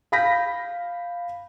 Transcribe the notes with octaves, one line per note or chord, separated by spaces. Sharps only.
F5 B5 G6 A#6 B6